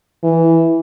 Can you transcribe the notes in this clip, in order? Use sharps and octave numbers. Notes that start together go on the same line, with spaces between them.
E3